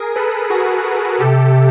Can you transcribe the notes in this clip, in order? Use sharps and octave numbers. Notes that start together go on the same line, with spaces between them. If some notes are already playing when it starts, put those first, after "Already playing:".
Already playing: G#4 A#4
A4 B4
F#4 G#4
C3 G4 A4